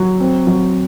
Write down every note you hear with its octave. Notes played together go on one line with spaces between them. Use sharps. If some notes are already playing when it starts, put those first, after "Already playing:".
Already playing: F#3
C4
F#3